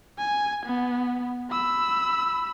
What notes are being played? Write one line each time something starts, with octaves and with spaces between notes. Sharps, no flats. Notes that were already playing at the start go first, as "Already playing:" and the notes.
G#5
B3
B5 E6